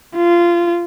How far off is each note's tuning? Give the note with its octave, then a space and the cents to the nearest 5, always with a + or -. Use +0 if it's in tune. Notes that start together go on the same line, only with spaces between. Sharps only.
F4 -20